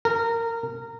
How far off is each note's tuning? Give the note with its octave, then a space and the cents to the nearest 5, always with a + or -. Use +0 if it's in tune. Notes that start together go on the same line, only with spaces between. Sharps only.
A#4 -20